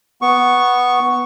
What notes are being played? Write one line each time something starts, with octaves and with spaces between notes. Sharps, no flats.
B3 C#6